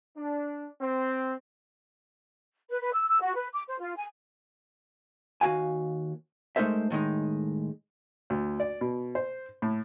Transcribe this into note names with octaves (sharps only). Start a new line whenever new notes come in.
D4
C4
B4
B4
E6
E6
F#4
B4
D6
C5
F4
G#5
D#2 F#4 F5 G#5
G#3 A3 D#4 A#4 C5 E5
A2 D#3 G#3 D#4
D2
D5
B2
C5
A2